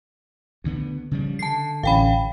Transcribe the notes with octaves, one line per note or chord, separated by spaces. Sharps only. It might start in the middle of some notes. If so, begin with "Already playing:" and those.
D2 D3 B3
C#3 F3 G3
D3 A5 C7
A1 C#4 F5 G5 B5